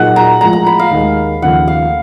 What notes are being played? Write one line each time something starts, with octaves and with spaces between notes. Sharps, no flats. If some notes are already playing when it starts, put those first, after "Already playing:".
Already playing: A#2 F#3 A#3 D#4 G#4 F#5
A#5
A2 F3 G#3 A#5
A#5
B5
F5
D#2 D#3 G#3
D#2 C#3 F3 A3 F#5
F5